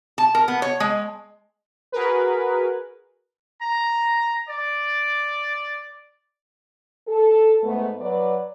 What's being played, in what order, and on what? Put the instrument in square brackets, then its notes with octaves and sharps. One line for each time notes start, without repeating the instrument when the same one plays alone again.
[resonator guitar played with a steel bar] A5
A#4
B3
C#5
G#3
[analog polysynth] F#4 G#4 A#4 B4
[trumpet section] A#5
D5
[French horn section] A4
G#2 A3 B3
F#3 B4 D5